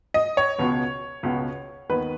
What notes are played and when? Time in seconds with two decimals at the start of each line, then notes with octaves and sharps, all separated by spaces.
0.14 D#5
0.37 C#5
0.58 C#2 B2 B3
1.23 C#2 B2 B3
1.89 D#2 D#3 B3 B4